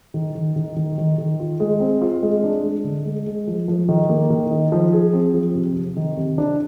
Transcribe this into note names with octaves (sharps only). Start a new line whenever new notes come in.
D#3
D#3
D#3
D#3
D#3
D#3
F4
G#3
C4
F4
G#3
D4
G#3
D3
G#3
G#3
F3
F3
D#3
A#3
D#3
D#4
F3
G#4
C4
F3
C3
C3
D#3
C3
D4